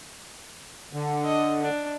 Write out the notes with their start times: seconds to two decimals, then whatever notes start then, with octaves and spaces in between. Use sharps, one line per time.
0.93 D3
1.25 D#5
1.62 D4